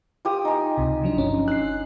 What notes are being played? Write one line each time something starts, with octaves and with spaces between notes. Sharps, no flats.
F4 G4 D#6
D#4 G#5
C#2 C3
F3 F#3 D4
G1 C#4 D4
E6 F#6 C7